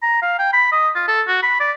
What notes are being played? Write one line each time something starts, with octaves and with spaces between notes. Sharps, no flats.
A#5
F5
G5
B5
D#5
F4
A4
F#4
B5
D5